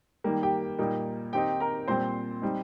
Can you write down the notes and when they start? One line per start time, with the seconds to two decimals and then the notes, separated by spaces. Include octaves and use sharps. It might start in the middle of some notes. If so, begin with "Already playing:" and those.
0.24 D#3 G3 A#3
0.43 G4 G5
0.78 A#2 G3 A#3 D#4
1.33 D#3 C4 D#4 G4 G5
1.60 A#4 A#5
1.88 A#2 G3 C4 C5 C6
2.42 G3 C4 D#4